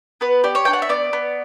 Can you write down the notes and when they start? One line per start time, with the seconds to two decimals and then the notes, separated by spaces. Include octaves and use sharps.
0.21 B3 B4
0.44 G4 D5
0.55 C#5
0.65 D4 G5
0.73 F#5
0.82 E5
0.89 B3 D5
1.13 B3